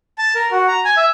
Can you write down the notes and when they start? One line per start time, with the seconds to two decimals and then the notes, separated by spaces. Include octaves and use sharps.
0.18 A5
0.35 A#4
0.51 F#4
0.68 A#5
0.85 G#5
0.97 E5